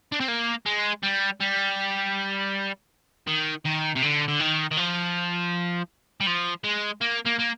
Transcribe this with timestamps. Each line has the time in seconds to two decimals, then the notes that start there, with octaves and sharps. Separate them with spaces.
0.12 D4
0.20 C4
0.28 A#3
0.66 G#3
1.03 G3
1.41 G3
3.27 D#3
3.65 D#3
3.95 C3
4.02 D3
4.28 D3
4.40 D#3
4.71 D#3
4.77 F3
6.20 G3
6.27 F3
6.64 G#3
7.01 A#3
7.26 A#3
7.40 A#3